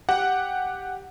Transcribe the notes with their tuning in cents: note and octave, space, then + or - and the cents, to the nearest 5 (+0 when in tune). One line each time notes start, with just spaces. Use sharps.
G4 +0 F#5 +0